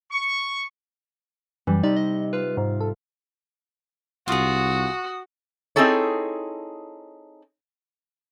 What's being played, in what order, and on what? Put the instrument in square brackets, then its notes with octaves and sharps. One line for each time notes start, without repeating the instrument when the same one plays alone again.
[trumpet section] C#6
[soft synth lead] F#2 [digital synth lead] E3 [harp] G3
[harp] C3 [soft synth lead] D#4 [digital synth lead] D5
[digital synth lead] D#5
[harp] F4 [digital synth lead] B4
[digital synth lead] G#2
[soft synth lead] A4
[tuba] C2 [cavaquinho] F4 G#4 [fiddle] F#4 [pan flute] D#6
[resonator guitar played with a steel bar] C4 D#4 E4 G#4 A4 C#5